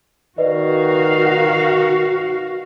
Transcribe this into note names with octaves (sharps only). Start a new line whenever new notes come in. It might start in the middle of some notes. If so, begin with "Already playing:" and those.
D#3 F#4 B4 D5 D#5 F5